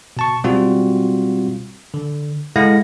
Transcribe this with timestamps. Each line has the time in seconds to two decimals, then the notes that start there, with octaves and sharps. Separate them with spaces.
0.17 B2 A5 C#6
0.44 B2 G3 C4 F4 F#4
1.94 D3
2.56 G#3 E4 A4 F5 F#5 A#6